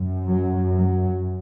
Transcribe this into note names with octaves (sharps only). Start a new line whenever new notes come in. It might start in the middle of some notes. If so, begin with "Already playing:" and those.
Already playing: F#2
F#3
F#3